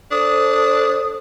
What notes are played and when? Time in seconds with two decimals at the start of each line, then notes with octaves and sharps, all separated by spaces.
0.11 D4 A4 C5 D#6